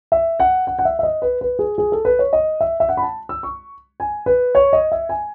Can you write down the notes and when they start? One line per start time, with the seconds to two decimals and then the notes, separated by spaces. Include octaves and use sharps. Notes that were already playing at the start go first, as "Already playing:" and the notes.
0.12 E5
0.40 F#5
0.67 F#5
0.79 F#5
0.85 E5
0.99 E5
1.03 D#5
1.22 B4
1.41 B4
1.59 G#4
1.78 G#4
1.92 A4
2.05 B4
2.19 C#5
2.33 D#5
2.61 E5
2.80 E5
2.89 F#5
2.97 B5
3.02 A5
3.29 E6
3.43 C#6
4.00 G#5
4.26 B4
4.55 C#5
4.73 D#5
4.92 E5
5.09 G#5